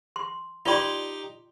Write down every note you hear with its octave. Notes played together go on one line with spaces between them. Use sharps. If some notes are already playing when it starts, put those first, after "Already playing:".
C6
D#4 F4 G4 D5 C6